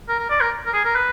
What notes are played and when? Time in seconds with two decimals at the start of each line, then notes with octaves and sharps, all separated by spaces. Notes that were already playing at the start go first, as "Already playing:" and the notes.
0.08 A#4
0.19 A#4
0.30 D5
0.41 A#4
0.66 A#4
0.73 G#4
0.85 A#4
0.95 B4